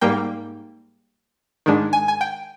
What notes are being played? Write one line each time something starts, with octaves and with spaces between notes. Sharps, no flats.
G#2 G3 A#3 G5
G#2 D#3 G#3 D4
G#5
G#5
G5